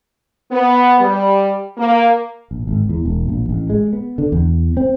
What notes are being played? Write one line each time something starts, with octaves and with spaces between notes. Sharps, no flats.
B3
G3
A#3
A#1
G#1
E2
E1
A#1
A1
G#3
B3
D3
E2
C4